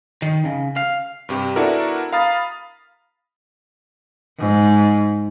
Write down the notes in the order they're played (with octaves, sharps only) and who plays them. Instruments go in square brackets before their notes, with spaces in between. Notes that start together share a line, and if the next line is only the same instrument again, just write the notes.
[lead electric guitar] D#3
C#3
F5
[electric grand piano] G2 C3 G4
B3 D4 E4 F#4 A4 A#4
F5 A#5 B5 D#6 F6 A6
[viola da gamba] G#2